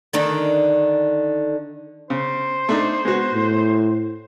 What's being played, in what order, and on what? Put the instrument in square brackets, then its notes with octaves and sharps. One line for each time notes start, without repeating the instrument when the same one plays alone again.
[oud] D3 D#3 D4
[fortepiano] C#3 [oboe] C5
[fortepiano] A3 D4 D#4
G#3 B3 F#4
[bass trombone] A2